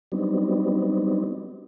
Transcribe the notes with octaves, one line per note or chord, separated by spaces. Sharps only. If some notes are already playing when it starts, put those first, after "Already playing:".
F#3 G3 B3 C4 D4 D#4